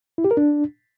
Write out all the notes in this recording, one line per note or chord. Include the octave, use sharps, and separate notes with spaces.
E4
G4
A#4
D4